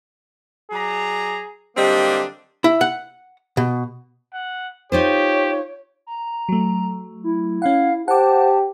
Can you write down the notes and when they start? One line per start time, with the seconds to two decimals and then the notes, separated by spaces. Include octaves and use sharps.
0.72 F#3 G#4 D5 A#5
1.77 D3 F#3 G3 A#3 C4 D4 D#5
2.64 E4
2.81 F#5
3.57 B2
4.33 F#5
4.92 D#4 F4 G4 C5 C#5
6.07 A#5
6.49 F#3 A3
7.24 E4
7.62 C#4 F5 F#5
8.08 G4 C5 F#5 A5 D6